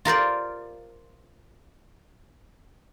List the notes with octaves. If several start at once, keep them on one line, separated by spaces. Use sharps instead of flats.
F4 A#4 C5 D5